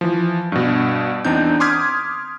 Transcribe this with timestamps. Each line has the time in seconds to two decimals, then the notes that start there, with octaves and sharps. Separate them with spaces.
0.01 E3 F3
0.52 G2 B2
1.25 E2 C4 D4 D#4 G6
1.60 C6 D6 D#6 F6 G#6 B6